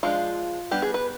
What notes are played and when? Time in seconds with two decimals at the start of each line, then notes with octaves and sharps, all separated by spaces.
0.03 F3 G#3 D4 F4
0.71 G3 B3 D4 G4
0.82 G#4
0.94 B4